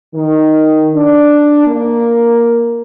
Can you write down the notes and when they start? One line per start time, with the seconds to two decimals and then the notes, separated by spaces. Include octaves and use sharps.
0.14 D#3
0.95 D4
1.66 A#3